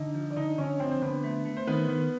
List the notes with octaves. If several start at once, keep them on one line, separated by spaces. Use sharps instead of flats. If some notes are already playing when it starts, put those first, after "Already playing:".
Already playing: D3 D#4 D#5
F3
D5
D3 D#4 D#5
D3 C#4 C#5
F3 C4 C5
C5
D3 B3 B4
A3
A3
C5
D#3 B3 B4
D#3